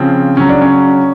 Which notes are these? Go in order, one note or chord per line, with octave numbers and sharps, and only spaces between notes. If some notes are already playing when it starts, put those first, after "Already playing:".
Already playing: C#3 F3 C4
C#3 F#3 C#4
D4
C#4